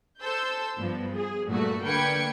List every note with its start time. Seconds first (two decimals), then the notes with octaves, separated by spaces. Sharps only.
0.20 A4 C5 E6 G6
0.79 G2 F3 B3
1.15 G#4
1.50 G2 A#2 A3 F#4
1.85 D3 A#3 B4 G5 G#6 C#7